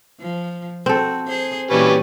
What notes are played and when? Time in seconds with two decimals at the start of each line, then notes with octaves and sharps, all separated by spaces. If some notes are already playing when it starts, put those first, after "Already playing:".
0.20 F3
0.86 C4 F#4 A4
1.27 G#4 C5
1.70 A#2 E3 G3 C#4 F#4 B4